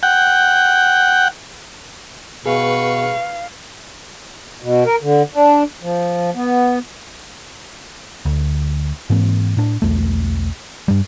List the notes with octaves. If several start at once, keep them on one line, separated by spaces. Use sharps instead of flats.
F#5 G5
B2 G#4 B4 F5 C#6
B2
A#4
D3
D4
F3
B3
D2
G#2 E3 A#3 C4
A2 D4
B1 E2 A3
G2 G3